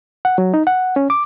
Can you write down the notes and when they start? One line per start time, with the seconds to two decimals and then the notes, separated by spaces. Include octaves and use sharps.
0.25 F#5
0.38 F#3
0.54 D#4
0.67 F#5
0.96 C#4
1.10 D6